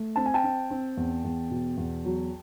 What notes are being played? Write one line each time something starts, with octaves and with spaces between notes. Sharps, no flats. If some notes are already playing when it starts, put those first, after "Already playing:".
Already playing: A3
C4 A5
G#5
G5 A5
C4
C4
E2
E2
B2
E2
F#3